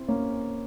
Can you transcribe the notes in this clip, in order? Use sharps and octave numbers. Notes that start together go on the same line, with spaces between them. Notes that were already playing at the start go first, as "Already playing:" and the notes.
Already playing: C4 E4
A#3 C#4